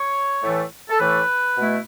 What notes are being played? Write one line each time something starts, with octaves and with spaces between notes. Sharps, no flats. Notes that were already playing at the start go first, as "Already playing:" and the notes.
Already playing: C#5
A2 E3 A3
A4
A2 E3 A3 B4
B2 A3 E4